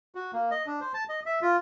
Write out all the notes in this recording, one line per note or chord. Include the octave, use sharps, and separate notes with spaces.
F#4
A#3
D#5
D4
C5
A5
D#5
E5
F4